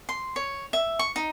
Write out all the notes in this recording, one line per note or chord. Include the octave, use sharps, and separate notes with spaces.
C6
C#5
E5
C#6
D#4